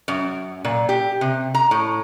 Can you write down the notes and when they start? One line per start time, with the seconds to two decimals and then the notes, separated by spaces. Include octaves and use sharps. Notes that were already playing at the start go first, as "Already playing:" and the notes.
0.08 F#2
0.65 A#2
0.89 G4
1.21 C3
1.54 A#5
1.71 A2